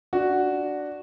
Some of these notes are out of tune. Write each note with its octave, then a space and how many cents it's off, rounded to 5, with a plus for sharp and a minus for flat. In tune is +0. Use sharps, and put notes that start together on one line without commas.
D4 +0 F#4 +0